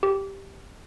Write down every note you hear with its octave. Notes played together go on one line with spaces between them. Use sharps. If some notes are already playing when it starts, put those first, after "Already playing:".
G4